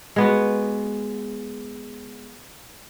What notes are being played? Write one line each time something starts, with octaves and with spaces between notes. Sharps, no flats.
G#3 B3 F#4